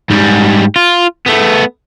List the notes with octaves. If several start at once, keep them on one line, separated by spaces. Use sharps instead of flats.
G#2 G3
F4
A3 B3